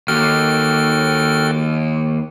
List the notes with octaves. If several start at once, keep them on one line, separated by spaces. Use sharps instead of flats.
D#2 F#4 A4 G5 F6